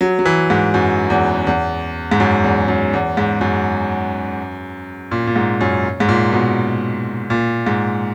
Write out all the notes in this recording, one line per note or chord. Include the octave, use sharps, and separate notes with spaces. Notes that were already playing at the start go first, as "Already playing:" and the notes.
F#3
F#3
E3
G#2
F#2
E2
E2
G#2
F#2
E2
F#2
E2
G#2
F#2
A#2
A#2
G#2
F#2
G#2
A#2
B2
A#2
G#2